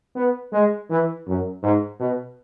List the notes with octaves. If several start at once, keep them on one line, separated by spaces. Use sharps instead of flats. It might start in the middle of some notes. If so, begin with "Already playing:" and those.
B3
G#3
E3
F#2
G#2
B2